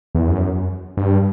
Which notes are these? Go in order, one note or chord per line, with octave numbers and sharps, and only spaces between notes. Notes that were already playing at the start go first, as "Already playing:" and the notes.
E2
F#2
G2